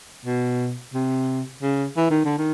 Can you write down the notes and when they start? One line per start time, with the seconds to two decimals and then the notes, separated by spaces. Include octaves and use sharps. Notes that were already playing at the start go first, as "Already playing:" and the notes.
0.26 B2
0.94 C3
1.62 C#3
1.97 E3
2.10 D#3
2.25 D3
2.38 D#3